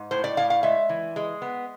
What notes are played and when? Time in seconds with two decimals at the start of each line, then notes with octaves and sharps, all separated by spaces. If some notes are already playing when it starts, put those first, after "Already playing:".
Already playing: G#2
0.11 A2 C5
0.24 D5
0.37 A2 F5
0.50 F5
0.63 G#3 E5
0.89 E3
1.16 G#3
1.42 B3